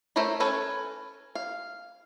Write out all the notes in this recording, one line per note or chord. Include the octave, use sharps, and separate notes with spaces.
A3 A#4 C5 C#5 B5
C#4 A4 B4 C#5 G#5
F5